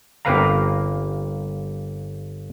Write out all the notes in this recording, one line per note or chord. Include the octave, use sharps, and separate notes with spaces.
G1 A#3 C4 B4 F5 A#5